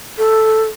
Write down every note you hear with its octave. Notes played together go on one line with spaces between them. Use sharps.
A4